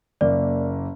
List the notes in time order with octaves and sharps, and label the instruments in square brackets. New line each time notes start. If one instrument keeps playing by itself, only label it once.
[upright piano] F#1 A#3 [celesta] D5